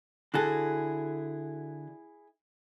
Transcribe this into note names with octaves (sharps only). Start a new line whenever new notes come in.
D3 E4 F#4 G#4 A4